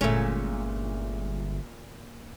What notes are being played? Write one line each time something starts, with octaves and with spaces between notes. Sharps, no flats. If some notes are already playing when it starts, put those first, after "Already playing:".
G1 A#2 G#3 A3 C#4